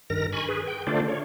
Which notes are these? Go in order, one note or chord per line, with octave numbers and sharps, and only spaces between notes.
G2 D#3 A#4 A#6
G#5 B5 C#6
G#4 B4
G5
D3 A3 D4 F4 C5 D5
C#5